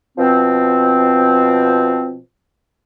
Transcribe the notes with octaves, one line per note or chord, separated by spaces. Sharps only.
B2 F3 C4